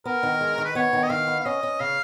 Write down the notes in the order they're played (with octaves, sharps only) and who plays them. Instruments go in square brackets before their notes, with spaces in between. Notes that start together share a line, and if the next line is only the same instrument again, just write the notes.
[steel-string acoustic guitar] B3 [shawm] A#4
[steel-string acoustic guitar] D#3
G#3
D#3
[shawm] B4
[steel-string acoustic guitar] B3 [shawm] C#5
[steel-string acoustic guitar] D#3
[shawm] D#5
[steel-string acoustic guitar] D#3 [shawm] F5
[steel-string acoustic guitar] B3
[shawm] F5
[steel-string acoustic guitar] C#4 [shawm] D#5
[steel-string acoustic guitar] C#4
[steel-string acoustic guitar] C#3 [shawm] F5